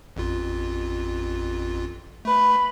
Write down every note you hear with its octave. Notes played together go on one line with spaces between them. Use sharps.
A1 F2 F4
A3 B4 B5